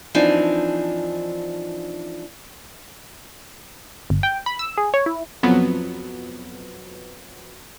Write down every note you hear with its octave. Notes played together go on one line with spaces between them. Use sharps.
E3 F3 C4 D4 D#4 G#5
G1
G5
B5
E6
G#4
C#5
E4
F2 B2 F3 F#3 B3